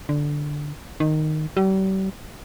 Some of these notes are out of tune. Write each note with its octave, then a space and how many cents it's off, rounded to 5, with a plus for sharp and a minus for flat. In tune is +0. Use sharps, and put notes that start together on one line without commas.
D3 +0
D#3 -10
G3 -40